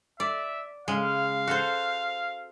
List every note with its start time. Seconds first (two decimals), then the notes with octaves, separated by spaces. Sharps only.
0.20 D5 E5
0.88 C#3 G#3 F5
1.47 F#4 A4 C5